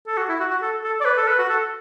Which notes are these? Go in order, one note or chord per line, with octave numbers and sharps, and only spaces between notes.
A4
F#4
E4
F#4
F#4
A4
A4
D5
B4
A4
B4
F#4
A4